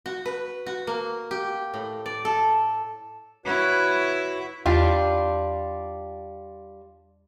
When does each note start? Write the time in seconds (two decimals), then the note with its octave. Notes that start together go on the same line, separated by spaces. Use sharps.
0.06 F#4
0.25 B4
0.66 F#4
0.87 A#3
1.31 G4
1.74 A2
2.06 D5
2.25 A4
3.46 E4 F#4 B4 C#5
4.66 E2 G3 D4 F4